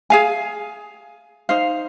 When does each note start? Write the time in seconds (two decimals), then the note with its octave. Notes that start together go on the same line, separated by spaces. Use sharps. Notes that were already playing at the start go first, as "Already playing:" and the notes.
0.10 G#4 F5 G#5
1.49 D#4 C5 F5